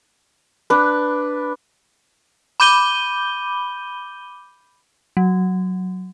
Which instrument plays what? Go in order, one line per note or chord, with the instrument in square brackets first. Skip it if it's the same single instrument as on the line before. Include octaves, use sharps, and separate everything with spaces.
[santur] D4 B4
[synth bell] B5 D6 G6 D#7 G7
F#3